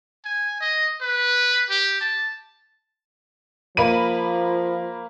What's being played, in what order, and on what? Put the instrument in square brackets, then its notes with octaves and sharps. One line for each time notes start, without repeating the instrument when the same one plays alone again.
[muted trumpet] G#5
D#5
B4
G4
A5
[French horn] F3 [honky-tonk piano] A#3 B5 D#7